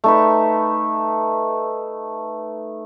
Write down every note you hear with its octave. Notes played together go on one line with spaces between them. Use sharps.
A3 D#4 B4